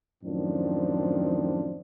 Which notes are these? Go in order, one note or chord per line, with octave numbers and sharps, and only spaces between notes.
F#2 A2 D#3 F3 C4 D4